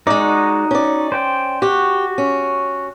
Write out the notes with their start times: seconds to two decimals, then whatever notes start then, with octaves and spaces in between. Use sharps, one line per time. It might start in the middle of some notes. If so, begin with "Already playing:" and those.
0.07 G#3 D#4 F#4 D5
0.71 C#4 D5
1.12 C5 G5
1.62 F#4 G4
2.18 C#4